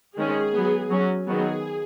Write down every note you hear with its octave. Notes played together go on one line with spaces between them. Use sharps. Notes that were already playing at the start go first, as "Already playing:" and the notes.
D#3 G#3 C#4 G#4
F#3 B3
F#3 C#4
D#3 F#3 B3 G#4